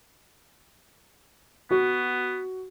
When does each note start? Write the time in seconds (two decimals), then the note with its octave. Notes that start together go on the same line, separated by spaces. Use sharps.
1.71 B3 F#4